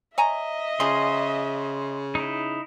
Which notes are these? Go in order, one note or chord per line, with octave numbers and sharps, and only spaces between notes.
C#5 D#5 E5 G#5 A#5
C#3 F3 F4 G#4 C6
D#4 E4